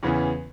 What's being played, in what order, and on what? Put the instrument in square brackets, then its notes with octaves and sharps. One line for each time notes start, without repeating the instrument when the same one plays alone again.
[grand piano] E2 C#3 E3 B3